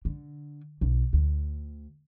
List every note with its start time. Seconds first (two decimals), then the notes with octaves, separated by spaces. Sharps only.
0.05 D3
0.81 B1
1.13 D2